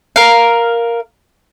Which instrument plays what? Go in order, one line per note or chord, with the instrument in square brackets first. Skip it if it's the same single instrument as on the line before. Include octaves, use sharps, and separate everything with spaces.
[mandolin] A#4 F5